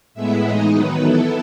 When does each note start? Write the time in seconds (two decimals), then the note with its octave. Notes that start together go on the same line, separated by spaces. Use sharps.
0.14 A2 G#3 B3 E4 E5
0.43 A2 E3 G#3 D#4 D#5
0.72 D#3 F#3 B3 B4
1.01 E3 B3 E4 A4